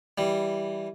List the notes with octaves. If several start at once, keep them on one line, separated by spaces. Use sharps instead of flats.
E3 G3